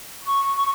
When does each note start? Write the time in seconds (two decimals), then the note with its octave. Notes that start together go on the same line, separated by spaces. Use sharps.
0.24 C#6